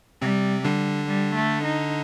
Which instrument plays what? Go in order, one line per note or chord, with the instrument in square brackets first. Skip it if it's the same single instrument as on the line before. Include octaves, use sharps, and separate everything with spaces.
[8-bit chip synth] C3 C4 [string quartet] G3
[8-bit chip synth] D3 D4 [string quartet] G3
[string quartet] G3
A3
D#4